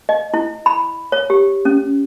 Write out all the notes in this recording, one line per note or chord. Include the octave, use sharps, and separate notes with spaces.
D#5
E4
B5
C#5
G4
C#4